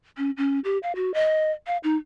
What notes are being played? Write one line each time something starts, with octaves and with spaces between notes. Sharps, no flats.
C#4
C#4
G4
F5
F#4
D#5
F5
D#4